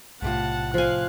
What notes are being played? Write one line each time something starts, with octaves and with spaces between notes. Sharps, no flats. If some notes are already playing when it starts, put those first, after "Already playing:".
B1 A2 C3 F4 F#5 A5
F3 F5 G#5 F#6